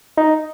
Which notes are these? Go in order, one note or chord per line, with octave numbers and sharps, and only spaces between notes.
D#4